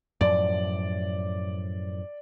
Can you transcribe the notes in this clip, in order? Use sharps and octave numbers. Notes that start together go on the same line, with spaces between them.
F#2 A2 F3 D5